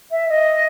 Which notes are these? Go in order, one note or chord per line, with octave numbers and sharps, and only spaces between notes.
E5
D#5